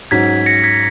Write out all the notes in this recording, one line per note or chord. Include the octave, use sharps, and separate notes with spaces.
G#2 F#3 C#4 F#4 G#6 B6
A#6 C#7
G#6 B6